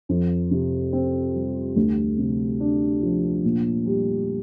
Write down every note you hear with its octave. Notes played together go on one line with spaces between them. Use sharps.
F2
C3
C4
G3
D2
C3
D4
F3
A#2
G3